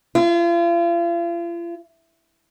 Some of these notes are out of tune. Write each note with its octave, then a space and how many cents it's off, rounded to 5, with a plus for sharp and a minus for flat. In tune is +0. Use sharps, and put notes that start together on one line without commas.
F4 -40